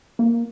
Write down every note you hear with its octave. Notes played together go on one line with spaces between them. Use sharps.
A#3